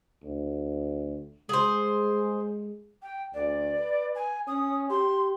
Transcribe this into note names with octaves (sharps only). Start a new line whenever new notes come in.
D2
G#3 G#4 C5
G5
D2 D5
B4
G#5
C#4 D#6
G4 C6